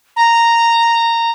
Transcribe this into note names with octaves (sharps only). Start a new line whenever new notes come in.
A#5